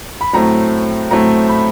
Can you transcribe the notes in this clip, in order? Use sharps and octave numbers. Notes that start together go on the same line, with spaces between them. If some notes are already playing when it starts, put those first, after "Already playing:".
B5
A2 F#3 A3 C4 A#5
A2 F#3 A3 C4 A#5
B5